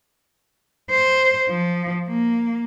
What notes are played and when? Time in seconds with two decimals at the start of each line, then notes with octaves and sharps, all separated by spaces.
0.90 C5
1.50 F3
2.08 A#3